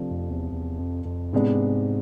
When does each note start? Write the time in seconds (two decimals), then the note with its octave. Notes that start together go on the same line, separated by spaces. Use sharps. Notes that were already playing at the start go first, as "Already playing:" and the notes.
Already playing: C3 F3 A3 D4
0.11 F2
0.30 E2
0.52 E2
0.79 F2
1.05 F2
1.33 G#2 C3 G#3 B3 D4
1.42 A2
1.51 G#2